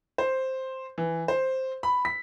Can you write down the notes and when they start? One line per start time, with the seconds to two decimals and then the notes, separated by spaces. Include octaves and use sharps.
0.18 C5
0.98 E3
1.28 C5
1.83 B5
2.05 B6